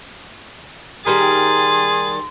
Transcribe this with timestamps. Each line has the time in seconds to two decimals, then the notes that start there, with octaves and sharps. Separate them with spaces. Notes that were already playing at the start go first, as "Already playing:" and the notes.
1.06 D#3 G3 G#4 A#4 C6 A6